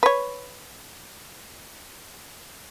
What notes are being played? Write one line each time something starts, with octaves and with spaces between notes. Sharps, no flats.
B4 C#5